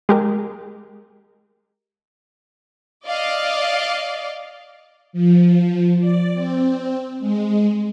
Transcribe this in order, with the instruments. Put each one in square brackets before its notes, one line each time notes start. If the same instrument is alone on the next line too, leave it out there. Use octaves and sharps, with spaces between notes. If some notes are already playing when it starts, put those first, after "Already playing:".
[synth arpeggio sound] G#3 G4 A#4
[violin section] D5 D#5 F5
[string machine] F3
D5
C4
G#3